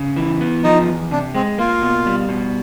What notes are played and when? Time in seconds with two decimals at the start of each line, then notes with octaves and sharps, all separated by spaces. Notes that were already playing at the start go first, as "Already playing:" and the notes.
Already playing: C#3
0.16 E3
0.41 B3
0.64 F3 D#4
0.87 E2
1.11 C3 D4
1.34 G#3 C4
1.58 A#3 F4
1.82 B2
2.06 G3
2.29 B2